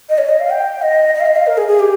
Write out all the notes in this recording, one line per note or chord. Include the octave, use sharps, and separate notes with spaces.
D#5
C#5
D#5
F5
G5
D#5
D#5
F5
D#5
F5
A#4
G#4
G#4
G4